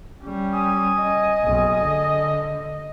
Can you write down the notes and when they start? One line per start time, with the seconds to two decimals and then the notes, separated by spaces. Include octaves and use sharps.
0.23 G3 C#4
0.54 G#5 D#6
1.02 D#5
1.44 F#1 B1
1.83 D3